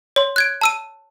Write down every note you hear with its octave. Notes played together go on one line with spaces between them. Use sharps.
C#5 C6
F#6 G#6 D7
A5 E6 D#7